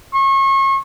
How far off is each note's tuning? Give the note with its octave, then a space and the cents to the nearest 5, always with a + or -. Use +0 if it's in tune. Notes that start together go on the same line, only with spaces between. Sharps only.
C#6 -35